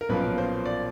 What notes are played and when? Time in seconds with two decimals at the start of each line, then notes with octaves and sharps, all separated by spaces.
0.01 A#4
0.09 B1 A#2 F3 A#3 C#4 B4
0.38 C5
0.65 D5